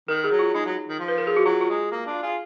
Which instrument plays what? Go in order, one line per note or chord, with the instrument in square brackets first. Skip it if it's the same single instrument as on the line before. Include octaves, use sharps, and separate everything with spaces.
[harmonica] D#3 [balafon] A#4
[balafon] G#4
[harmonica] F#3
[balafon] F4
[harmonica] G#3 [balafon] D#4
[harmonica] F#3
D#3
F3
[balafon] B4
A#4
G#4
F#4
[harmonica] F#3 [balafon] F4
[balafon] F4
[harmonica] G#3
A#3
D4 F4
F4 G#4